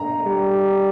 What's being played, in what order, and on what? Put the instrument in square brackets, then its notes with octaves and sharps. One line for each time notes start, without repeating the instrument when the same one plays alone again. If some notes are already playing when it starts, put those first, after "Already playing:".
Already playing: [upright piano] A#5
[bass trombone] G3